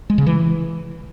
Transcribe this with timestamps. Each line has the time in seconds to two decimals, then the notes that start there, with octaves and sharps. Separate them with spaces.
0.10 G#3
0.18 C#3
0.27 E3